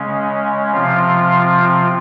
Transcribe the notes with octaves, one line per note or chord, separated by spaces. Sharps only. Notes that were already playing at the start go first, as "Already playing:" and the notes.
Already playing: C#3 G#3 C#4
C3 F3 C4 F4